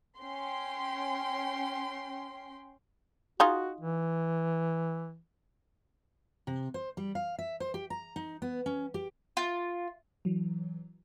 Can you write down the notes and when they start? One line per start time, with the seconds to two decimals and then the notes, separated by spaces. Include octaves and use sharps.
0.20 C#4 G5 C6
3.40 D#4 F4 F#4 G#4
3.81 E3
6.47 C3
6.74 C5
6.97 G3
7.15 F5
7.39 E5
7.60 C5
7.74 G4
7.90 A#5
8.16 D#4
8.42 B3
8.66 C#4
8.94 G4
9.37 F4
10.25 E3 F#3